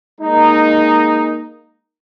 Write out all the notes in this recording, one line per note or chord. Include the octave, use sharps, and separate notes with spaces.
G#3 A#3 D#4